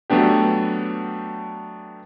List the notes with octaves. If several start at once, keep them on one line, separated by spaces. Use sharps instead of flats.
F#3 A3 B3 D4 G4